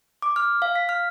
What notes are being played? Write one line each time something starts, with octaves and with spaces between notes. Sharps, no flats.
D6
F6
F5
B6
F6